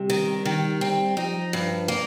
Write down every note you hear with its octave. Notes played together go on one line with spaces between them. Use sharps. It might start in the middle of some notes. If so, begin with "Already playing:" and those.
Already playing: C3 G3
D#3
D#3
C4
F3 D#4
G2
A#3